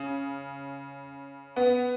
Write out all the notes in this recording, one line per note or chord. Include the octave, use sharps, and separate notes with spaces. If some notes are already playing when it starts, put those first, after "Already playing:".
Already playing: C#3
B3